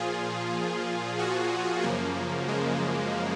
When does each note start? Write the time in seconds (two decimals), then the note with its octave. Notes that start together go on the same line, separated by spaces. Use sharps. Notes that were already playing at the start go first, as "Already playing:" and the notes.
Already playing: A#2 F3 F4 G#4
1.19 F#4
1.83 F#2 C#3 F3 A#3
2.48 G#3